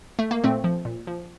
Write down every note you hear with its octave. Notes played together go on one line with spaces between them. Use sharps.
A3
A#3
A#2 A3 C4
F3
A#2
F3